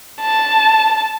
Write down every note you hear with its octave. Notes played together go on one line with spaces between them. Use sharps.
A5